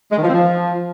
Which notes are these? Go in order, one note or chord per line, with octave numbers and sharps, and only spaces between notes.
G#3
D#3
F3
C4
F3